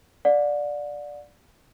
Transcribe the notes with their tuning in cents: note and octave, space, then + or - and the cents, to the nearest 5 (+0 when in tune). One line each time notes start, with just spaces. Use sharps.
D5 +0 F#5 -40